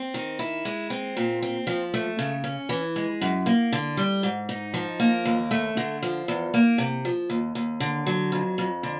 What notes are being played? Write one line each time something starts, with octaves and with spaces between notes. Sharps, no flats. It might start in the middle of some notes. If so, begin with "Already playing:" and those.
Already playing: C4
D#3
E4
G#3
C4
A#2
C4
F3
A3
C#3
C#4
E3
G#3
F#2
A#3
D3
G3
G#2
D#4
F3
A#3
D#2
A3
D3
F3
E2
A#3
C3
F3
D#2
D#2
D3
F#3
F2
F2
D3